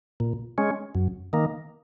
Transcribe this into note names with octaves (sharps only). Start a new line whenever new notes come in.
A#2
G#3 C#4
F#2
D#3 A#3